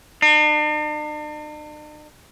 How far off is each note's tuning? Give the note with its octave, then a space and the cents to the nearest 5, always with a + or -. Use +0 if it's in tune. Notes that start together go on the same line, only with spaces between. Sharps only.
D4 +45